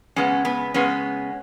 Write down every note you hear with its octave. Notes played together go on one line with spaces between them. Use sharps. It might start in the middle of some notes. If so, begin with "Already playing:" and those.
C#3 G#3 B3 C#4
B3
C#3 G#3 B3 C#4